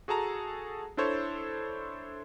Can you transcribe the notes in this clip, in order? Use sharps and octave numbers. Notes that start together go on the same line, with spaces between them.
F#4 G#4 A4 A5 A#5
D4 E4 A4 C5 C#5